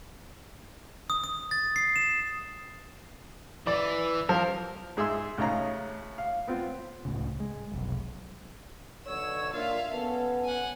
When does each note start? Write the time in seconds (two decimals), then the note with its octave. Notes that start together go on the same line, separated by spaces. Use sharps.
1.10 D#6
1.24 D#6
1.51 A6
1.76 C7
1.96 E7
3.67 E3 D5
4.29 F3 A#4
4.97 G#2 G#4 E5 C6 E6
5.37 A1 C#3 D#4 C#5 F5 A#5
6.18 F5
6.47 B3 C4 F4
7.05 C#2 A2 C#3
7.40 G#3
7.72 F1 B1
9.06 B1 D3 C#5 E6
9.53 A#3 D4 F4 E5 F5
9.94 B3 C#4 A4
10.44 F#5 G#5